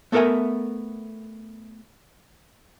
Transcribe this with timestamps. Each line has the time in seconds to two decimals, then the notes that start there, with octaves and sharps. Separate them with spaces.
0.12 A3 B3 A4 A#4 E5 G#5